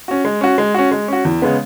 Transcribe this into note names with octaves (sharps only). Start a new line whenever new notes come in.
C#4 F#4
G#3
C#4 F#4
G#3
C#4 F#4
G#3
C#4 F#4
E2
C#3 G#3 B3